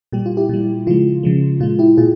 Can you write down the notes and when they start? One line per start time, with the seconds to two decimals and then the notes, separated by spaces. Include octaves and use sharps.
0.12 A#2 G3 G4
0.26 F4
0.37 E4 G4
0.49 A#2 G3
0.87 C#3 F3 G#3 F4
1.23 C#3 F3 G#3
1.60 A#2 G#3 F4
1.79 E4 G4
1.97 A#2 F4 G#4